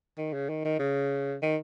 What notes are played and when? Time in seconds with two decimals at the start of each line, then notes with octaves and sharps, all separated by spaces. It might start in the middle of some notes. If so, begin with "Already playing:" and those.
0.18 D#3
0.33 C#3
0.49 D#3
0.65 D#3
0.79 C#3
1.42 D#3